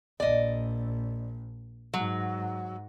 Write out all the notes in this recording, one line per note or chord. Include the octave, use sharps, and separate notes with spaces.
A#1 D5 D#5
G#2 F#3